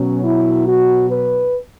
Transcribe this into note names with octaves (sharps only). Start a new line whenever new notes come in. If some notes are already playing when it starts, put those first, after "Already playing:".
Already playing: B2 F#3 C#4
E4
F#4
B4